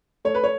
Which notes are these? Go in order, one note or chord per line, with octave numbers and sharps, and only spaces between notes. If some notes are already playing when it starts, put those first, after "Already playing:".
A3 C#5
B4
C#5